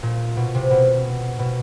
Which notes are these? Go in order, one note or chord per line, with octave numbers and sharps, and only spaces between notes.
A#2
B2
C3
B2
B2